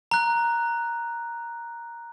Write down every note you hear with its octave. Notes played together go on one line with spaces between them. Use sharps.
A#5 F#6